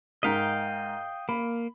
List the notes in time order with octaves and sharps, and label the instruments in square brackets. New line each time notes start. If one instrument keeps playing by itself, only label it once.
[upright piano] G#2 A#4 B6 [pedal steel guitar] D#5 F5 G5
[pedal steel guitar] A#3 [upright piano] B5